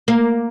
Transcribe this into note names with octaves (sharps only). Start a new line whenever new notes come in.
A#3